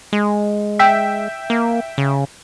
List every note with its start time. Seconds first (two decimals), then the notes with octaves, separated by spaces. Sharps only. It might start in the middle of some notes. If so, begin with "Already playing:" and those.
0.13 G#3
0.79 E5 G5
1.50 A#3
1.98 C#3